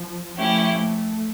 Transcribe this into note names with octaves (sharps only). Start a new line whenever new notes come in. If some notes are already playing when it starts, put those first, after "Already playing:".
Already playing: F3
F3 A3 C#4 E4 G4
A3